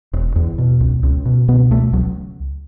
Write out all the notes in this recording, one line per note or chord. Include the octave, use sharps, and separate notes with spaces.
E1
E2
B2
C#2
C#2
B2
B2 B3
C#2 A3
C#2 F#3